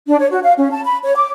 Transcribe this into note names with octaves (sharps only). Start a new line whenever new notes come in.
D4
C#5
F#4
F5
C#4
A5
B5
C#5
D6